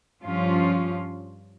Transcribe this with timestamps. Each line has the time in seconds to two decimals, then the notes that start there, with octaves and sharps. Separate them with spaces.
0.22 G2 F3 C#4 F4